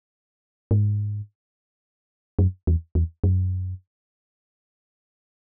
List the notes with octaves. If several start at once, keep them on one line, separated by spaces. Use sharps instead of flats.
G#2
F#2
E2
E2
F#2